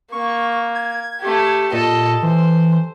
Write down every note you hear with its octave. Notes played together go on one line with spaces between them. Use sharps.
A#3 C#6
G#6
A3 G4
A#2 A4 D#5
E3 C5